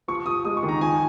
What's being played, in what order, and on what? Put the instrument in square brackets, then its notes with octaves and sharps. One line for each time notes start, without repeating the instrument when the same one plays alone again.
[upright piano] F3 [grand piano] C#6
[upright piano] F3 [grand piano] D#6
[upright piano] G#3 [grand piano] D#6
[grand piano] C#6
[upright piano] D#3
[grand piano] A#5
[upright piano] F3 [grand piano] G#5